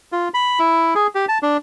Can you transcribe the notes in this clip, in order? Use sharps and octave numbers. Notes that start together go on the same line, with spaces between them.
F4
B5
E4
G#4
G4
A5
D4